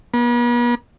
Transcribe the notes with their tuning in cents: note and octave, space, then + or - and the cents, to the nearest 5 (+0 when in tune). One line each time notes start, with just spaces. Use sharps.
B3 -45